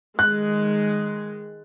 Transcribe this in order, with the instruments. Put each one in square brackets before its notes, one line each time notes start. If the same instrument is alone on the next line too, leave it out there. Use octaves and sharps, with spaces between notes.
[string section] D#3 G#3 [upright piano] F#6